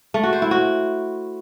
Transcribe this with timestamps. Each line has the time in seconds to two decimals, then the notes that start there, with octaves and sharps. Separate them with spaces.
0.14 A3
0.23 F#4
0.33 C5
0.42 E4
0.51 F#4